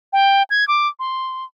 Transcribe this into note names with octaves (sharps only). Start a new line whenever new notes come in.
G5
G#6
D6
C6